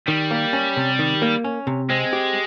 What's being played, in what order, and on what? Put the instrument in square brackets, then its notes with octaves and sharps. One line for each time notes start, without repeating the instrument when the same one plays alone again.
[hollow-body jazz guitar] D#3 [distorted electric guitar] G3
[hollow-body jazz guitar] A#3
C#4
C3
D#3
A#3
C#4
C3
[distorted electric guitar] G#3 [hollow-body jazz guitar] C4
[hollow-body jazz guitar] G4